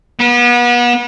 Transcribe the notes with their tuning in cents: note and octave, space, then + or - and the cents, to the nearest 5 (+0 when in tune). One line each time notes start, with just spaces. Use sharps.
B3 -35